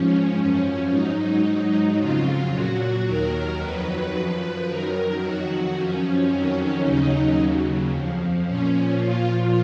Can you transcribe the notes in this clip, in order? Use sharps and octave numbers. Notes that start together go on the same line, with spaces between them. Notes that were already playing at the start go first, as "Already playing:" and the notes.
Already playing: G#2 F3 C#4
F#2 F3
G#2 F#3 D#4
G#2 F#3
F2 C#3 F#3 F4
A#2 F#3 F#4
D#2 D#3 F#3 A#4
F2 D#3 F#3 B4
F#2 F3 B4
F#2 D#3 F#3 A#4
F2 D#3 F#3 F#4
F#2 F3 C#4
F2 D#3 F#3 C#4
D#2 C#3 F#3 D#4
D#2 C#3 F#3
F2 F3
A#2 F3 C#4
A#2 F3 F4